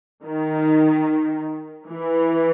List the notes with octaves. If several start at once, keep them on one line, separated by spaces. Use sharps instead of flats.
D#3
E3